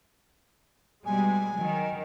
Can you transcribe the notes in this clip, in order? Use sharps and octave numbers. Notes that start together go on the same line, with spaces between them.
B2 G3 G#3 G#5
D#3 F#3